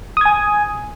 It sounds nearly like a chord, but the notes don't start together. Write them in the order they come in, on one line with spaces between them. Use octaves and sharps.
D#6 G#6 G#5